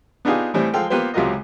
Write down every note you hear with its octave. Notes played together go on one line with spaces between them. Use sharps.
B3 D4 D#4 F4 G4 G#4
A2 E3 G3 C4
F3 G#3 A4 F5 G5
A#3 B3 F4 G4 B4 C5
C#2 C3 F#3 F4 A#4 D#5